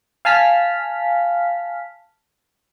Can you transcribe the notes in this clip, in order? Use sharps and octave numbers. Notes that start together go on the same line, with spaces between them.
F5 G#5 A5 F6 B6